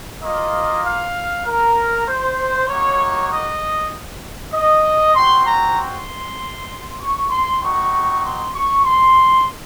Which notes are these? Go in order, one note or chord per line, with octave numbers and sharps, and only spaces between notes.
A#3 F4 D#5
F5
A#4
C5
A#3 D#4 F#4 C#5
D#5
D#5
C4 F#4 C6
A#5
C6
C#6
C6
C4 D#4 F#4 C#6
C6
C#6
C6